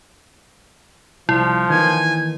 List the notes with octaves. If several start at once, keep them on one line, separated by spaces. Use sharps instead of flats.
C2 F3 E4
D#3 E3 A#3 G#5